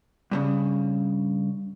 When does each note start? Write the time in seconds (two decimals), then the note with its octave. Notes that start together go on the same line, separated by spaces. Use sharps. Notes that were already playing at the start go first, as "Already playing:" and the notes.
0.31 G2 A#2 C#3